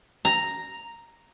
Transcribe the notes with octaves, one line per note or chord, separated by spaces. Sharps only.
A#5